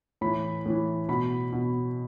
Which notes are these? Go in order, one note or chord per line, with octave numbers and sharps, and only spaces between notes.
A2 E3 B5
A2 E3
B2 B5
B2